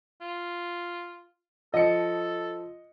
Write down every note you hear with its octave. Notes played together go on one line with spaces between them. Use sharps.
F4
F3 A4 D#5 C#7